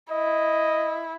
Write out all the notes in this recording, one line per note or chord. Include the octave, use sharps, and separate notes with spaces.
E4 D#5